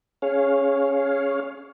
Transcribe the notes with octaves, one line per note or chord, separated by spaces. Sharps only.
C#4 G#4 C#5 F5